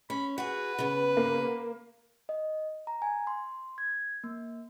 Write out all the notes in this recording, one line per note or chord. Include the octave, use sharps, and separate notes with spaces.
C#4 B5
F#4 G#4 B4
C#3 B3
A#3
D#5
A#5
G#5
C6
G#6
A#3